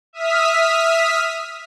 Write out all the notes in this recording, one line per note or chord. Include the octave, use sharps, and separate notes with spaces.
E5 D#6 F6 B6